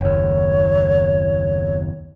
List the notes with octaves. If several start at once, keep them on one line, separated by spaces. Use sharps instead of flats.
F#1 D#2 C#5